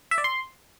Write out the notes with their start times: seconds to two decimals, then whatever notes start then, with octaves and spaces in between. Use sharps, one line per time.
0.11 E5
0.18 D5
0.24 C6